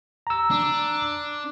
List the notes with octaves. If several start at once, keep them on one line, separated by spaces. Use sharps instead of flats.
A#5 E6
D4